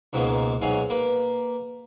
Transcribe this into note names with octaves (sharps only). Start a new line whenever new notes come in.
C#2 G#2 B2 G#3 A#3
B1 G#2 F#3 F5 G#5
A#3 A#4 B4